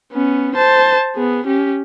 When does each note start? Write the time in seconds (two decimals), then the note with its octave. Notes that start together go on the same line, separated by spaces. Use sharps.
0.13 B3 C#4
0.55 C5 A5
1.16 B3 G#4
1.46 C#4 G4